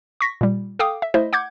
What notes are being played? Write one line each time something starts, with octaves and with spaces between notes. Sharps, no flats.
C#6 A#6 B6
A#2 G3
A4 F5 G5 D6 D#6
E5
A3 E4 C5 D#5 E5
F#5 D6 G6 G#6